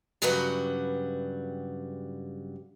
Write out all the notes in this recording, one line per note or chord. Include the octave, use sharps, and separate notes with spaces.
G2 C#3 F#3 G3 B4 F#5